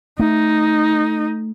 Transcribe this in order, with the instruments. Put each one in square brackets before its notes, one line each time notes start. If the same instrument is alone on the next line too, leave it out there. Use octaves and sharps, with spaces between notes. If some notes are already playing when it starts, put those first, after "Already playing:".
[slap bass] A3 [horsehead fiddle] D#4